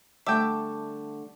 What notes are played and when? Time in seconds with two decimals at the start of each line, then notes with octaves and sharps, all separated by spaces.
0.27 D3 G3 A3 E5 G5 A5 D6